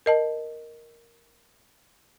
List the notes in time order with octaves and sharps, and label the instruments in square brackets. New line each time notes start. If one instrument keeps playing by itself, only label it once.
[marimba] A#4 D#5 A5